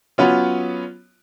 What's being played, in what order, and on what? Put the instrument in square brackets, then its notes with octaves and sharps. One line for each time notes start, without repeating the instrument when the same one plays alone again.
[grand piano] F#3 B3 C#4 F4